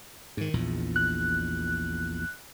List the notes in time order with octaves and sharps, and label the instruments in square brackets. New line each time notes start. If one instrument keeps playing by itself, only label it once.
[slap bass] G#2 D#3
A#1 E2 A#2
[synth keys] F#6